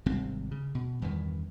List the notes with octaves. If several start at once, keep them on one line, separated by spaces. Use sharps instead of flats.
G#1 C3 G3 C4
C#3
B2
E2 G2 D#3 E3